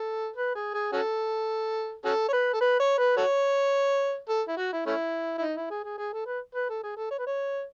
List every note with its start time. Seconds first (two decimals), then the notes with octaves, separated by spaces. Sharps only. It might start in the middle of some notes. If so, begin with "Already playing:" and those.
Already playing: A4
0.36 B4
0.55 G#4
0.74 G#4
0.93 C#4 F#4 A4
2.05 C#4 F#4 A4
2.28 C#5
2.33 B4
2.54 A4
2.61 B4
2.80 C#5
2.98 B4
3.17 F#4 A4 C#5
4.29 A4
4.48 E4
4.57 F#4
4.72 E4
4.86 A3 C#4 E4
5.38 E4
5.42 D#4
5.56 E4
5.70 G#4
5.84 G#4
5.98 G#4
6.13 A4
6.26 B4
6.55 B4
6.69 A4
6.83 G#4
6.96 A4
7.11 C#5
7.19 B4
7.27 C#5